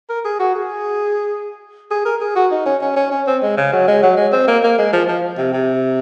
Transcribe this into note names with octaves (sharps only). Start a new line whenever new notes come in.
A#4
G#4
F#4
G#4
G#4
A#4
G#4
F#4
D#4
C#4
C#4
C#4
C#4
C4
G#3
C#3
F#3
G#3
F#3
G#3
C4
A#3
A#3
G#3
F3
F3
C3
C3